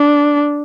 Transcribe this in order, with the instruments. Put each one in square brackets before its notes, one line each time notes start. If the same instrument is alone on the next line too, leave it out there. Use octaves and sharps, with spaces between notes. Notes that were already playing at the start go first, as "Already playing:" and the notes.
Already playing: [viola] D4